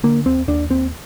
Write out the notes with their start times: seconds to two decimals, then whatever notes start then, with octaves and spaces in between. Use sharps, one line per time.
0.04 D3 A#3
0.26 D#2 C4
0.48 D#2 D4
0.70 D#2 C4